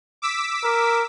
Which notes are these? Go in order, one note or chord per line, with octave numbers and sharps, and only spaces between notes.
D6 E6 B6
A#4